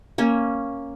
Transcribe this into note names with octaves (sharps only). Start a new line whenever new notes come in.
A#3 C#4